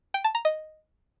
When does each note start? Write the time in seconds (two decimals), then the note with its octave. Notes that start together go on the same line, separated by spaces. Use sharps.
0.14 G5
0.24 A5
0.35 A#5
0.45 D#5